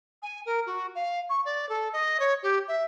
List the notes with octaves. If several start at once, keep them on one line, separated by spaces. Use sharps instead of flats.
G#5
A#4
F#4
F5
C#6
D5
A4
D#5
C#5
G4
E5